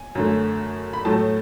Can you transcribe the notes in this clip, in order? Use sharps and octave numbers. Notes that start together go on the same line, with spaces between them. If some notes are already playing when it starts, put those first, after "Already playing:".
Already playing: G#5
F#2 D3 A3
B5
A2 F#3 A3 A5